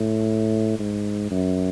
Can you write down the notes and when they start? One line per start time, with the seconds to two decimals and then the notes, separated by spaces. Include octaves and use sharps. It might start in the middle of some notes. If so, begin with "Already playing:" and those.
Already playing: A2
0.79 G#2
1.31 F#2